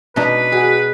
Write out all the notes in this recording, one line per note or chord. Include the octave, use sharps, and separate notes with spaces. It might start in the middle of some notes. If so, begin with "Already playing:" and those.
B2 D4 D#4 B4
F#4 G#4